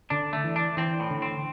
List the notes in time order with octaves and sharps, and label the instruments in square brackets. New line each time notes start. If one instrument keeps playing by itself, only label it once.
[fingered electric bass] D3 [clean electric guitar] D4
[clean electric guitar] A3
[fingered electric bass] E3
[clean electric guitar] D4
[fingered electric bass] E3 [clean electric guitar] C4
[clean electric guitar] A2
[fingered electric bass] D3
[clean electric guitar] C4